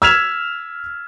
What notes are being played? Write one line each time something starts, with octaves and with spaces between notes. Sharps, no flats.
E6 F6 G#6 B6 E7 F7